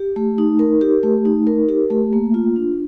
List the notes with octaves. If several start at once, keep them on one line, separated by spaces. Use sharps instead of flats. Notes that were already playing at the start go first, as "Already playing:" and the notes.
Already playing: G4
A3
D#4
A#4
G4
A3
D#4
A#4
G4
A3
A#3
F4
D4